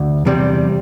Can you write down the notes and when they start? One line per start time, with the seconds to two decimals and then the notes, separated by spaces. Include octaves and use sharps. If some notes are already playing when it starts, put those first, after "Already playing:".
Already playing: D2
0.26 E2 C3 G3